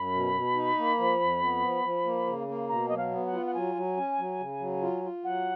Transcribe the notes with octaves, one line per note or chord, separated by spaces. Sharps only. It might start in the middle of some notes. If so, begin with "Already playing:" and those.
Already playing: F#2 B5
B2
B2
D#4
A#3
F3
F2
B3
F3
F3
A#3
C#3
A#3
B2 A#5
F#3 D#5
F5
B3
F#5
F4
F#5
F#3 G#5
F#3
C#4
F#3
C#3
F#3
F4
F4
F#3 F#5